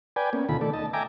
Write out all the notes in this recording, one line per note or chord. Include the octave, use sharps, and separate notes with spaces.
B4 D5 G5 G#5
A#3 B3 C#4
D2 B2 D#3 F4 A4 B5
D#3 A3 A4 D5
D#5 A5
E5 G5 G#5 A#5 D6